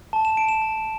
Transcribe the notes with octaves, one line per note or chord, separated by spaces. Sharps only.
A5
E7
A5 D7
E7
A5